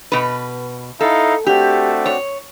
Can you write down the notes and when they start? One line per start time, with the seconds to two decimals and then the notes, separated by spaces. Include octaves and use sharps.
0.12 B2 B4
1.00 D#4 E4 A4 F5
1.46 A3 C4 D4 F#4 G4
2.06 C#5